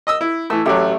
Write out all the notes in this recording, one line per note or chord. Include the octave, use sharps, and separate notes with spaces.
D#5 D#6 E6
E4
E3 A3 E6
A1 F#3 A3 G4